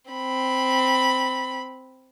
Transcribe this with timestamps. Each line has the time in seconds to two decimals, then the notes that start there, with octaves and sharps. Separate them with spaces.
0.11 C4 B5